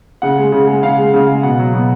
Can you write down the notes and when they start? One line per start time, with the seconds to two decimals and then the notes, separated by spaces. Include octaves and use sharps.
0.22 C#3 F#5
0.38 G#3
0.52 C#3
0.67 G#3
0.83 C#3 F5
0.98 G#3
1.14 C#3
1.28 G#3
1.43 B2 F#5
1.59 F#3
1.73 B2